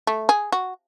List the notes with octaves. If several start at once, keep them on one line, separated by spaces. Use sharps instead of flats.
A3
G#4
F#4